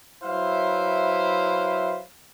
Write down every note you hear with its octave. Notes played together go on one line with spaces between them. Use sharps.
F#3 E4 B4 C5 E5 F5